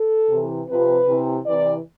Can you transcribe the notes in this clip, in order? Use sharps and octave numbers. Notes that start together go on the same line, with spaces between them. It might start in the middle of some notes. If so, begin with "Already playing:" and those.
Already playing: A4
C3 E3
C3 F3 B4
C3 E3
C3 E3 D5